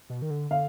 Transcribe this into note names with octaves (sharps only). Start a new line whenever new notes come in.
B2
D#3
D3
D3 F5